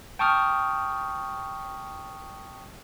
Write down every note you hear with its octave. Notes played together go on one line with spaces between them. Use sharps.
G5 A5 C#6 D#6 F6